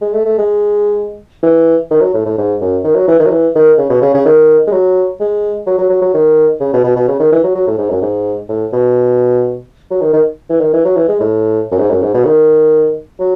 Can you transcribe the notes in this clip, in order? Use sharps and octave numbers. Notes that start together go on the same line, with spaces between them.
G#3
A3
A3
G#3
E3
D#3
F#3
A2
A2
G#2
F#2
D#3
F#3
E3
D#3
F#3
E3
D#3
C#3
B2
C#3
C#3
D#3
G#3
F#3
G#3
F#3
F#3
F#3
F#3
D#3
C#3
B2
B2
B2
C#3
D#3
E3
F#3
F#3
A2
G#2
F#2
G#2
A2
B2
F#3
D#3
D#3
E3
D#3
E3
F#3
E3
G#3
A2
F#2
G#2
F#2
G#2
B2
D#3
F#3